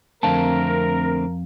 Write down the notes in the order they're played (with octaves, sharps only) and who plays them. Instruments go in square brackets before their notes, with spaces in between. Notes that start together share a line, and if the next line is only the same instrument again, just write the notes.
[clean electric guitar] F2 F5 A5 [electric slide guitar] D3 A3 C4 [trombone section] A#4